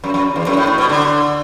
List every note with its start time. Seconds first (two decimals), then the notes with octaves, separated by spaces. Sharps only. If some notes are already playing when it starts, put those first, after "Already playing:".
0.04 F#2
0.14 F#2
0.36 E2
0.47 F#2
0.57 A2
0.67 A2
0.78 B2
0.89 D3